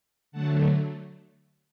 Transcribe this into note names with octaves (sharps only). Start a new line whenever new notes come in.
D3 F#3 A3 F#5 A5